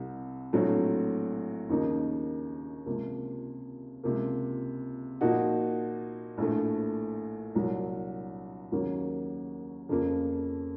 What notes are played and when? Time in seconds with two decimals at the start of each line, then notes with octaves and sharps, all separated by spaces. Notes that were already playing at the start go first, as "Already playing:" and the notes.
Already playing: C2 C3
0.53 A#1 A2 F#3 A3 C4
1.69 D#2 C#3 F3 A#3 D#4
2.86 C#2 C3 F3 A#3
4.03 C#2 C3 F3 A#3
5.21 A#2 F3 A#3 D#4 F#4
6.38 A#1 A2 F3 A3
7.55 C2 A#2 F#3
8.72 D#2 C#3 F#3 A#3
9.89 F2 C#3 F3 A#3